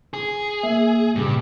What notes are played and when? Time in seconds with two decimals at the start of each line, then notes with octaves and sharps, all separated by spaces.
0.14 G#4
0.63 A#3 E5
1.15 G2 A#2 C#3 G3